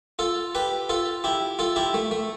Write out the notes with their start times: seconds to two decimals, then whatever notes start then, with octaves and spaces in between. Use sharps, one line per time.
0.19 F4 A4
0.55 G4 B4
0.89 F4 A4
1.24 E4 G4
1.59 F4 A4
1.76 E4 G4
1.94 A3
2.11 A3